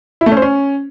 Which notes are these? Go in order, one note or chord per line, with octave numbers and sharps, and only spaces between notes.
E4
A3
C#4
C5
C#4